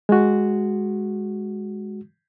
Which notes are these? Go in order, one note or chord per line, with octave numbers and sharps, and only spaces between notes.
G#3 F#4